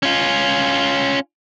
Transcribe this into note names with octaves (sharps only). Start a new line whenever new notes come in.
C#4 F4